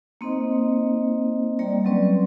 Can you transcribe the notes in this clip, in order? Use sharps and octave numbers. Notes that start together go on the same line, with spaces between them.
A#3 C4 D#4 C5 D#5
G3 A#3 D5 G5
F#3 G3 C4 C#4 B4 D5